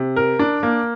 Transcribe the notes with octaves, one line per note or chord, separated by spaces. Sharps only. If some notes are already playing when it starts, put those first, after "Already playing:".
Already playing: C3
A#4
D4
A#3